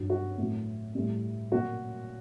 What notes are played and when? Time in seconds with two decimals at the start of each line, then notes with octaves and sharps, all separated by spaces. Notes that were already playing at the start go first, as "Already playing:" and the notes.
Already playing: G2 F#3
0.10 F#4
0.38 A2 F#3
0.95 A2 G3
1.52 A#2 F#3 F#4